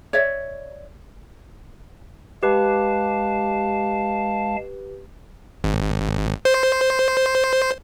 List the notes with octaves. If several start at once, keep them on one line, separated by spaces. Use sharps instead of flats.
C#5 D5 E5
G#3 G4 B4 F5 A5
G#1
C5